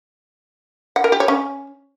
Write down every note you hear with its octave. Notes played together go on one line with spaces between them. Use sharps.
F#5
A#4
G4
C#5
C#4